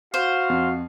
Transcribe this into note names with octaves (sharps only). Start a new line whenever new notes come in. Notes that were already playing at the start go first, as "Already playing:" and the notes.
F#4 C5 F5
F2